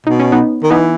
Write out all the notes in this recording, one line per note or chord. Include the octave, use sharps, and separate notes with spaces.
B2 D#4
C#4
B3 D#4
D#3
E3 B3 D#4